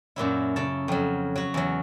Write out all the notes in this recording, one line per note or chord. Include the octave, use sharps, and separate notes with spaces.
F#2 A#2 F#3 E4
C#3 A5
F2 F#3
F#3 F#4
E2 F#3